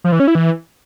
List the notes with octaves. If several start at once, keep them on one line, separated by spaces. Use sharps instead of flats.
F3
E3
C#4
E4
E3